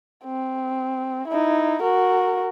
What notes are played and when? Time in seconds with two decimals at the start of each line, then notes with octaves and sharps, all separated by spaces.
0.25 C4
1.28 D#4 E4
1.82 F#4 A#4